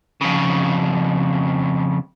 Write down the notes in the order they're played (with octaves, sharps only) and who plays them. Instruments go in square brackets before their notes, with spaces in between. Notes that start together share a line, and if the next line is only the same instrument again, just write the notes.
[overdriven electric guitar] F2 C#3